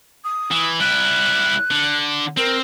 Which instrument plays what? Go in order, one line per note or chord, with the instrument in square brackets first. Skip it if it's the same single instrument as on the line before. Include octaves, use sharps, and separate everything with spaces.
[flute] D#6
[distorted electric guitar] E3
[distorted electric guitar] G3 E4 [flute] F#6
[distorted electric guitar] D3
[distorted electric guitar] C4 [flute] A#4